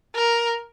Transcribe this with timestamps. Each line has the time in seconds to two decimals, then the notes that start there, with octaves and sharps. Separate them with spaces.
0.16 A#4